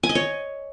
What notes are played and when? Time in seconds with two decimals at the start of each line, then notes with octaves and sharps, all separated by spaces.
0.03 G#5
0.09 D#5
0.15 C#5